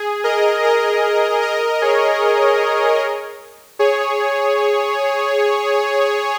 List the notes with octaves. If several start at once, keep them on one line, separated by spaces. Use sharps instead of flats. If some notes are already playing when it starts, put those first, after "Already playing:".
Already playing: G#4
A#4 D#5
A#4 D#5
A#4 D#5
G#4 C#5
G#4 C#5